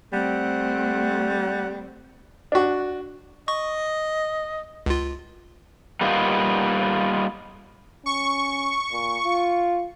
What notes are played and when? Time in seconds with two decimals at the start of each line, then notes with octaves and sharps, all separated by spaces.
0.13 G3 A3 C4 F#5
2.52 D4 F#4
3.48 D#5 C#6
4.86 C#2 F4
6.01 G3 A#3 B3 D#4 F4
8.06 C#4 C#6
8.92 A#2
9.24 F4